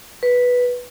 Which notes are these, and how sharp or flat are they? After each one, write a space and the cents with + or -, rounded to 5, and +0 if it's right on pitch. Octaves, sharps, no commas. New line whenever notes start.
B4 -5